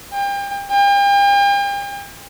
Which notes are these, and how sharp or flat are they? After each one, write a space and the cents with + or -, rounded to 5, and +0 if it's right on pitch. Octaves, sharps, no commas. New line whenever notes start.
G5 +35
G5 +40